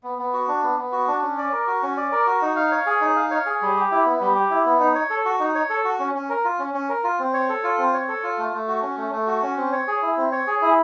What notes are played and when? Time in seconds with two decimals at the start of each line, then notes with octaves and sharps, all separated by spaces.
0.03 B3
0.18 B3
0.33 F#4
0.48 D4
0.63 B3
0.78 B3
0.92 F#4
1.08 D4
1.22 C#4
1.38 D5
1.53 A#4
1.67 F#4
1.83 C#4
1.97 D5
2.12 A#4
2.27 F#4
2.42 D#4
2.56 F5
2.72 C#5
2.86 G#4
3.01 D#4
3.16 F5
3.31 C#5
3.46 G#4
3.62 G3
3.76 G4
3.91 E4
4.06 B3
4.21 G3
4.35 G4
4.50 E4
4.66 B3
4.80 D#4
4.95 C#5
5.10 A4
5.25 F#4
5.40 D#4
5.55 C#5
5.70 A4
5.85 F#4
5.99 C#4
6.14 C#4
6.29 A#4
6.45 F4
6.59 C#4
6.74 C#4
6.89 A#4
7.04 F4
7.19 C4
7.34 C#5
7.49 A4
7.64 F4
7.78 C4
7.94 C#5
8.08 A4
8.23 F4
8.38 A3
8.53 A3
8.68 F#4
8.83 C#4
8.97 A3
9.12 A3
9.27 F#4
9.43 C#4
9.57 C4
9.72 C#5
9.88 G#4
10.02 E4
10.17 C4
10.32 C#5
10.47 G#4
10.62 E4